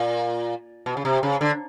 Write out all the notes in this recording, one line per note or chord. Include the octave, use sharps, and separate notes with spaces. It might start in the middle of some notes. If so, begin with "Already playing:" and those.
Already playing: A#2
B2
C#3
C3
C#3
D3